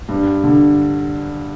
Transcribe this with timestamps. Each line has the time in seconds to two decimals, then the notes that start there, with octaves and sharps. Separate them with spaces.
0.09 G2
0.44 D3